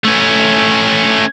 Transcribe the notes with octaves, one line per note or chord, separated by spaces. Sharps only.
A3 C#4